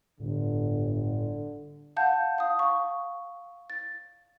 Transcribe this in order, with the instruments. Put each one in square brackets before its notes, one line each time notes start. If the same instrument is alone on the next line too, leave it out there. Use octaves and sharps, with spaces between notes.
[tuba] G1 [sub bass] A2 [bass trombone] D3
[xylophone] F5 F#5 A5 G6
F5 D#6
C#6
A6